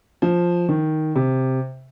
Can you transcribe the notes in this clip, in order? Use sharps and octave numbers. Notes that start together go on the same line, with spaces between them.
F3
D#3
C3